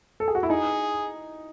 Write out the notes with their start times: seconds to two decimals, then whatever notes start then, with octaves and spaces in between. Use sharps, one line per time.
0.20 A4
0.28 G#4
0.35 F#4
0.43 E4
0.50 D#4 G#4